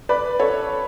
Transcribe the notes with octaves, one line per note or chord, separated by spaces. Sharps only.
B4 D5
A4 C#5